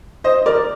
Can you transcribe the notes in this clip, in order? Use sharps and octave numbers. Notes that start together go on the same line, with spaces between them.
C5 D#5
A#4 D5